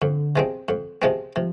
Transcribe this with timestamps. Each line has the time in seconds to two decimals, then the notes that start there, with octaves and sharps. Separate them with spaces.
0.02 F2 D3
0.36 C3 F3 G#3 C4
0.69 F2
1.02 C3 F3 G#3 C4
1.36 C3 F3